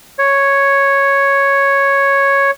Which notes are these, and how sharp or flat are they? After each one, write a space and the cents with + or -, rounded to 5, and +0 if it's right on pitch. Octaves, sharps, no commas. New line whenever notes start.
C#5 +0